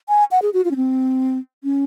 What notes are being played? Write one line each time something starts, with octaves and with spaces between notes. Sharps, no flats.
G#5
F#5
G#4
F#4
F4
C#4
C4
C#4